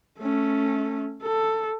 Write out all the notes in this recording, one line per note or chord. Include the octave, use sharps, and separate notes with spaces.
A3 C#4
A4